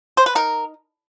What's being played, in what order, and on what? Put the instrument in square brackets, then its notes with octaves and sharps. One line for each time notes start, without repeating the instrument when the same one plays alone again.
[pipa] C5
B4
D#4 A#4